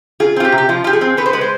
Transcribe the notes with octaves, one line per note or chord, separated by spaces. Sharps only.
F4 G#4
C4 F4
G4
C3
G4
F3 F4
F4 G4
G#4
C4
B3 B4
C5
G#3 B4
C5